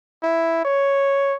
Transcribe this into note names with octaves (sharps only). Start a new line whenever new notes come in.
E4
C#5